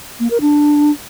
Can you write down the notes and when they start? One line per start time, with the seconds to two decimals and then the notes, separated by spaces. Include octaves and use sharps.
0.20 A#3
0.31 A#4
0.41 D4